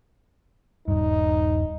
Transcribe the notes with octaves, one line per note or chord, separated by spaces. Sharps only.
D#1 G2 D#4